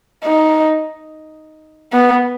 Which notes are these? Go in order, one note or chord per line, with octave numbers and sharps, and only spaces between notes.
D#4
B3